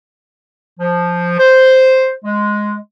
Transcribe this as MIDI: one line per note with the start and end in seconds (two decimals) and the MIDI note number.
0.80 1.38 53
1.39 2.12 72
2.25 2.78 56